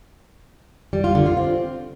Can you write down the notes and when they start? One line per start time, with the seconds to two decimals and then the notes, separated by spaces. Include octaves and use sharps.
0.93 G3
1.04 F4
1.15 D3
1.26 F4
1.37 C4